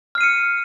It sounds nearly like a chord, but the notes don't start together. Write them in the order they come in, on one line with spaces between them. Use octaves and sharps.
F6 C7 D#7 C#7